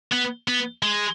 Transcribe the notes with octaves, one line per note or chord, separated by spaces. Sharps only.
B3
B3
G#3